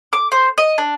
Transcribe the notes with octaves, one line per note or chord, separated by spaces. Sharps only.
D6
C5
D#5
D4